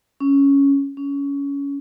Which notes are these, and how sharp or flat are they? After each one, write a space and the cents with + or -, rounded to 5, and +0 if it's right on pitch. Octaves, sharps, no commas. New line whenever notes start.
C#4 +5
C#4 +20